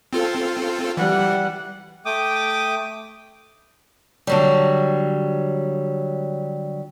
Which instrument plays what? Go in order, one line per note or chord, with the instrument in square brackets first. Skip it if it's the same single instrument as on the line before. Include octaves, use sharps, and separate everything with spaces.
[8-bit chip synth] C4 F4 A4
[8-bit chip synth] E3 [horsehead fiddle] G3 F#5
[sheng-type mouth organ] A3 G5 D6 D#6
[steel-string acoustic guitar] D3 F#3 G3